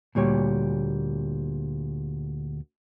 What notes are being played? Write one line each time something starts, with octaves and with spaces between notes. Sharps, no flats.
D2 A#2 G3 C#5